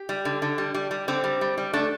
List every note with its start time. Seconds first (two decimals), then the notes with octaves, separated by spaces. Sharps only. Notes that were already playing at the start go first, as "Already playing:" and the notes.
Already playing: G4
0.09 G3
0.25 D3
0.42 D3
0.58 G3
0.74 G3
0.91 G3
1.08 D3 C4
1.24 G3
1.41 G3
1.58 G3
1.73 A3 D4